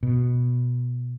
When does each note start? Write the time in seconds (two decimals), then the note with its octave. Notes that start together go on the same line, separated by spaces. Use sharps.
0.03 B2